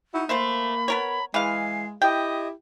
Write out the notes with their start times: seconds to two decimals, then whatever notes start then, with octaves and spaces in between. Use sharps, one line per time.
0.14 D#4 E4 F#4
0.29 A3 A#3 C5 E5 B5
0.88 B3 A#4 C#5
1.34 E3 G#3 F5 C7
2.02 E4 G4 D#5 G5